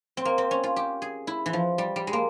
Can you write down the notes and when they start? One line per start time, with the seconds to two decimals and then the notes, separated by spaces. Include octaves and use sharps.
0.17 C4
0.25 A#3
0.38 C4
0.51 C#4
0.63 F4
0.76 G4
1.02 G#4
1.27 E4
1.46 E3
1.53 F3
1.78 G3
1.96 G3
2.07 G#3
2.13 A#3